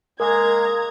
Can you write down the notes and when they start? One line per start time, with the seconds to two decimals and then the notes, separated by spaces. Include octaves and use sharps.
0.20 G#3 A#3 G#4 A#4 A#5 G#6